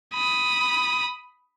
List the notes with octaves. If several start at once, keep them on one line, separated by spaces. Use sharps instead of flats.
B5 D#6